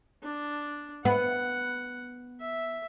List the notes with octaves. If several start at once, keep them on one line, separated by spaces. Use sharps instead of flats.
D4
B3 F#5
E5